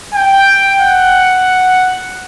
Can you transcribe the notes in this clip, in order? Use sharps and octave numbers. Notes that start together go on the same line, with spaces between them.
G5
F#5